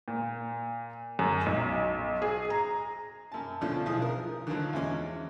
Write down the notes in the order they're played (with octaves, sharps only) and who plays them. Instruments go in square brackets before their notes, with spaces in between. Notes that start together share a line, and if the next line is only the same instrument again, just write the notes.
[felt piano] A#2
F#2
B1
G#4
A#5
[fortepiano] F#2 A5
B2 D3 F3 A3 C#4 D4
B1 F3 E4 G#4 D#6
A#4
D3 D#3 F3 F#3
E2 G#3 C#4